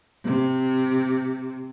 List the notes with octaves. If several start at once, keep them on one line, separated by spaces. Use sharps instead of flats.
C3